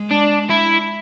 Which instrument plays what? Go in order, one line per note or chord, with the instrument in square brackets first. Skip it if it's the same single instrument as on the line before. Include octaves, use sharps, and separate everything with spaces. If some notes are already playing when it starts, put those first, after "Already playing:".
Already playing: [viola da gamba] G#3
[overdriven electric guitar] D4
E4